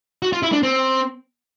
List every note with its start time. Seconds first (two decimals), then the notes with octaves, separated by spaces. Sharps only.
0.22 F#4
0.33 F4
0.43 E4
0.52 D4
0.63 C4